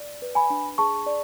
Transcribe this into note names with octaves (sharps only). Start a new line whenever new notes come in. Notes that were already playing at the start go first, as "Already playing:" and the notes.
Already playing: D5
B4
G#5 B5
D4
G#4 A5 C#6
D5